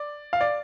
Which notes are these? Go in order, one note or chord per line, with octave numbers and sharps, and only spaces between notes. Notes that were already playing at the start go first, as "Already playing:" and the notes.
Already playing: D5
F5
D5